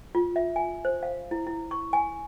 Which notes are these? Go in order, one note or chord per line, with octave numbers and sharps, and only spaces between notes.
F4
E5
G#5
C5
F5
E4
E4
C#6
G#5